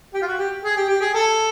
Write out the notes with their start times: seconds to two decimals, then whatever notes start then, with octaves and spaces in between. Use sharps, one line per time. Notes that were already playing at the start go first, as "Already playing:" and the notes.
0.14 G4
0.22 F4
0.26 F#4
0.38 G4
0.64 G#4
0.77 G4
0.89 G4
1.01 G#4
1.14 A4